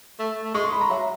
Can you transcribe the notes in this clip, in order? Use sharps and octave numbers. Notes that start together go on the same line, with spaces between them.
A3
A3
G#3 C#6
C6
B5
A#5
F#3 E5